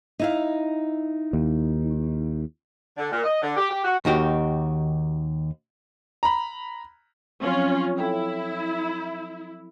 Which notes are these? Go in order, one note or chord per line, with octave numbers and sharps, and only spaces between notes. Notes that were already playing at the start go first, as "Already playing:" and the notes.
D#4 E4 F5
D#2
D3
A#2
D#5
D3
G4
G4
F#4
D#2 D#3 F#4 G4
A#5 B5
F3 F#3 C4 C#4 F4
E4 A4 C#5 G5